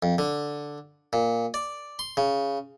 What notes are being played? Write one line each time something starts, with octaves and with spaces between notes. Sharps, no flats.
F2
D3
A#2
D5
C6
C#3